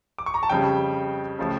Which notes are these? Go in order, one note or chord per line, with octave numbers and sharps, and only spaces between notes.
D6
C#6
A#5
A5
F2 C#3 G3 G5
C#3 F3 A3